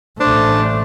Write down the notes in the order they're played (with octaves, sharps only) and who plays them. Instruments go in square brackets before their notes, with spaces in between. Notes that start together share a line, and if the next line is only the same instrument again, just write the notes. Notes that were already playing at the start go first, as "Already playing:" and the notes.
[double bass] A1 A3 [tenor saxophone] D4 [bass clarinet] C5